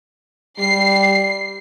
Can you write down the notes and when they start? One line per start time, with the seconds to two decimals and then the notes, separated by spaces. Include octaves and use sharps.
0.59 G3 C7